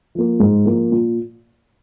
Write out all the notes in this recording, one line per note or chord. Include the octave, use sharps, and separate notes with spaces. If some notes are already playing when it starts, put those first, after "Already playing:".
F3 A#3
G#2
F3 A#3
A#2